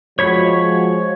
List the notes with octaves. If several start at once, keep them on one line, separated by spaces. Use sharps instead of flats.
F3 G#3 F#4 C#5 B5 C#6